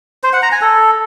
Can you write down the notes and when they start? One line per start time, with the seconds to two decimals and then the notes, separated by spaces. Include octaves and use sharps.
0.24 C5
0.33 F#5
0.43 A#5
0.52 G#5
0.62 A4